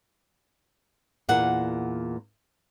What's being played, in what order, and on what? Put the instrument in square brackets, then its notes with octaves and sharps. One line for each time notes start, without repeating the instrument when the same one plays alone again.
[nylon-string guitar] E2 A#2 A#3 F#5